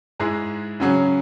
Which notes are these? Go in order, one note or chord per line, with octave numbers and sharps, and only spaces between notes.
G#2 G#3 E4 G#4
C#3 F#3 C#4 G#4